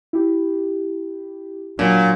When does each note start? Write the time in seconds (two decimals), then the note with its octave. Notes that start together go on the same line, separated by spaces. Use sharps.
0.13 E4 G4
1.79 A#2 F#3 D4